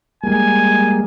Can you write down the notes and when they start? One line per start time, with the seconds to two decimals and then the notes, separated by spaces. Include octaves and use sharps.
0.24 G3 G#3 A#3 G#5